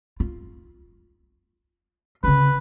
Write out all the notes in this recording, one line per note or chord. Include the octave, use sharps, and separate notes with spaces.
F4
C#3 C#4 B4